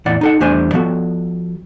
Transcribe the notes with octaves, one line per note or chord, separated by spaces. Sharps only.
E2 A2 E3 D5 F#5
D#4 A4 F#5
E2 G3 A3 D4 C5 G#5
F3 B3 F#4 A4